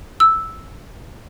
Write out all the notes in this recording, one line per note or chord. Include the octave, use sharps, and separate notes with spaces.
E6